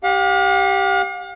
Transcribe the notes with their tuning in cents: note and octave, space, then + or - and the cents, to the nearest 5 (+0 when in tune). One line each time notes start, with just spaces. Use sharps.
G4 -5 F5 +45